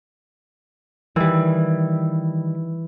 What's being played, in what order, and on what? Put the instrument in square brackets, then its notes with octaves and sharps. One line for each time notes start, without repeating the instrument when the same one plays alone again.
[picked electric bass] D#3 G3 [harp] E3